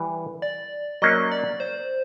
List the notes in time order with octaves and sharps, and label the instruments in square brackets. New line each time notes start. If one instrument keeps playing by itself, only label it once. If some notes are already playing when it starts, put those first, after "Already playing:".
Already playing: [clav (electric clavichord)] E3 G3
[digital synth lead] D5
[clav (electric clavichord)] F#3 A#3 C#4 [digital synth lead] D#5
[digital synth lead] D5
C5